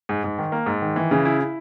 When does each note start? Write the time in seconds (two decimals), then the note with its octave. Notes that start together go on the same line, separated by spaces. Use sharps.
0.09 G#2
0.24 G#2
0.38 D#3
0.52 A#3
0.66 G#2
0.82 D#3
0.96 E3
1.11 C#3
1.25 E4
1.39 E4